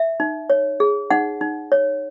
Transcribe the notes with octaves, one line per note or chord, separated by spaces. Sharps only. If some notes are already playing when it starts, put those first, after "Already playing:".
Already playing: E5
D#4
C#5
G#4
D#4 F#5
D#4
C#5